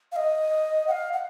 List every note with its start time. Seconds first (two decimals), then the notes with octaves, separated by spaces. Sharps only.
0.12 F5
0.16 D#5
0.87 F#5
0.91 F5
1.13 F#5